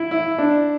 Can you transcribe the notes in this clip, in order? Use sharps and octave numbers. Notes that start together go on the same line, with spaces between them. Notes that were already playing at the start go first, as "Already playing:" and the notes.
Already playing: E4
E4
D4